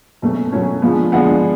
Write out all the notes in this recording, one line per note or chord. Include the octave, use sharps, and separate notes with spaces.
B2 F#3 A3 C#4
B2 F#3 A3 C#4
D3 F3 G#3 B3
D3 F3 G#3 B3 F#5